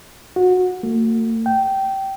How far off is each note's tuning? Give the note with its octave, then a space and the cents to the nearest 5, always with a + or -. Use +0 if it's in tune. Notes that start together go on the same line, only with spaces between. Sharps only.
F#4 -20
A3 +45
G5 -15